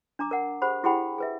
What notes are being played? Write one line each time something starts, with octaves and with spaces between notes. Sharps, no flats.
D4 A#5 D6
A#4 F#5
G4 G#4 C5 F#5 B5
E4 G4 G#4 F#5 G5 B5
G#4 B4 E5